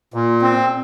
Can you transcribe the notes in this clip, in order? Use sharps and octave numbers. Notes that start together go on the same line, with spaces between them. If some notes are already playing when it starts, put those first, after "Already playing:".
A#2
C4